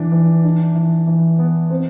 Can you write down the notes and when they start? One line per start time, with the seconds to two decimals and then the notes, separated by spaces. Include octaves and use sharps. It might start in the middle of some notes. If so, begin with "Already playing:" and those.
Already playing: E3 D4
0.12 E3
0.44 D4
0.75 E3
1.07 E3
1.39 B3
1.70 C4